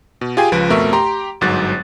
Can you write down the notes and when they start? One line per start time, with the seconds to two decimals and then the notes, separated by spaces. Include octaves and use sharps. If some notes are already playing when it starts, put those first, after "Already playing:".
0.21 B2
0.37 F4 G4 G#4 G5 G#5
0.52 C#2 F3 B4 D7
0.70 F2 B2 A3 A#4 E5 C#6
0.93 G4 A#5 C6
1.41 G1 G#2 F#3 F#6 A6